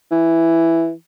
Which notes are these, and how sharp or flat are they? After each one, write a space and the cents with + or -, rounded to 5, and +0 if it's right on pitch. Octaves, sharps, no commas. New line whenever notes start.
E3 +5